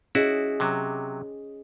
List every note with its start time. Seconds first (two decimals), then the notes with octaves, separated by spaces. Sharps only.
0.15 C#4 E4 F#4 G#4 D#5
0.60 C3 F#3